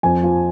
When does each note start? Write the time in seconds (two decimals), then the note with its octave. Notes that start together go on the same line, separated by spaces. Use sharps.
0.03 F2 G#5
0.23 F3